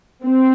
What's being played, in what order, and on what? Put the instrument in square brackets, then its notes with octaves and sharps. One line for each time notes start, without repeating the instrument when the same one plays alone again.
[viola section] C4